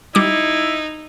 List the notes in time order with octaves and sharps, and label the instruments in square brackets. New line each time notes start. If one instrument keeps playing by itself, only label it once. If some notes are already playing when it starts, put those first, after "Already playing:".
[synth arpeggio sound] G3 D6 [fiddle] D#4 [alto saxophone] E4